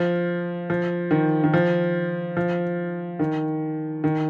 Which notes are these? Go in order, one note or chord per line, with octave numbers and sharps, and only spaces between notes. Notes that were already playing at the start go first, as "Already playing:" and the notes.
Already playing: F3
F3
D#3
D#3
F3
F3
D#3
D#3